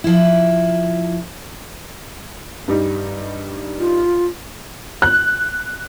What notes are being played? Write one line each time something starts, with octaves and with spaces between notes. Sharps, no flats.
F3 E4
G2 G3 D#4
F4
F#6